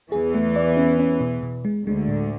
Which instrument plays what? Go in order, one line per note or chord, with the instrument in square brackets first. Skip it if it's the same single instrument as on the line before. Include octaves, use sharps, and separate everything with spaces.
[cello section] E2 E3 [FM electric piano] G#4
[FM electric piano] A3
D5
C#4
C#4
B2
B2
G#3
[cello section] D2 D3 [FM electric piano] G#3
[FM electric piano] A2